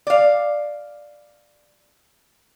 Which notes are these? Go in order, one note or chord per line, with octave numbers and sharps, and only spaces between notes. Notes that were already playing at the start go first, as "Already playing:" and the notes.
D5 F5